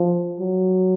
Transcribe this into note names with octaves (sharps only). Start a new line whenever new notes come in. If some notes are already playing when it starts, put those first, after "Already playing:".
Already playing: F3
F#3